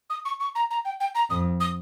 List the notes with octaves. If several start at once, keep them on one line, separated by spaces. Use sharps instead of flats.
D#6
C#6
C#6
A#5
A#5
G5
G5
A#5
F2 D#6
D#6